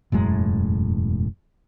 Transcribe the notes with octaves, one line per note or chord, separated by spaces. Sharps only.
E1 F#2 A2 G#3